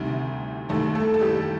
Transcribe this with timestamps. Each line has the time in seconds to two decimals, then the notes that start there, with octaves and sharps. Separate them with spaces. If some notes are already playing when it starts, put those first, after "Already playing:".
Already playing: D2 C3 D#3 G3
0.69 D#2 D#3 G3 A3 A4
0.95 A3 A4
1.14 A4
1.21 G3 G4